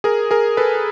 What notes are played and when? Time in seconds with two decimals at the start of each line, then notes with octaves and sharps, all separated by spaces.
0.04 G#4 A#4
0.31 G#4 A#4
0.57 A4 B4